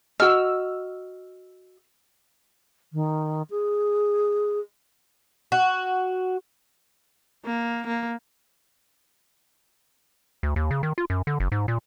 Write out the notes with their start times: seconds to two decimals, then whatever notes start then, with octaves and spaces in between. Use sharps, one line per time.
0.20 F#4 D#5 E6 F6
2.93 D#3
3.50 G#4
5.52 F#4
7.45 A#3
7.87 A#3
10.43 D2
10.56 D#2
10.71 C#3
10.83 D#3
10.98 F4
11.10 F#2
11.27 D3
11.40 F#1
11.52 G#2
11.68 A#2